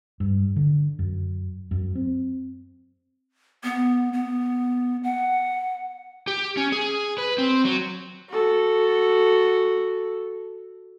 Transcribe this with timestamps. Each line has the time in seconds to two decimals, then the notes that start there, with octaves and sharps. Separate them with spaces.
0.20 G2
0.56 D3
0.99 F#2
1.71 F#2
1.95 C4
3.64 B3
4.13 B3
5.03 F#5
6.28 G4
6.57 C#4
6.72 G#4
7.18 B4
7.38 C4
7.65 F#3
8.29 F#4 A4